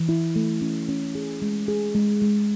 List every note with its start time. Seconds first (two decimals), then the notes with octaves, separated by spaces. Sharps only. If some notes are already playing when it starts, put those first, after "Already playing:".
Already playing: E3
0.09 E4
0.36 A3
0.62 C#4
0.89 C#4
1.15 G#4
1.42 G#3
1.68 G#4
1.95 G#3
2.22 G#3